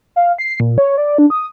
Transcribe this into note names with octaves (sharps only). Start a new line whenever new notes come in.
F5
C7
A#2
C#5
D5
D4
D#6